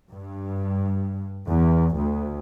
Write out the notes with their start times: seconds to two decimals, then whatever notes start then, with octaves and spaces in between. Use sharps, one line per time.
0.10 G2
1.48 E2
1.96 D2